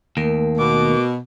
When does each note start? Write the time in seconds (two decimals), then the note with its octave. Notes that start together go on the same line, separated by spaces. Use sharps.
0.17 D#2 A3 A#4
0.58 B2 D6